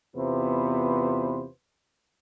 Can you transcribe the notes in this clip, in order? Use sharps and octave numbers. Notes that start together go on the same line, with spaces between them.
E2 C3 B3 F4 B4 C5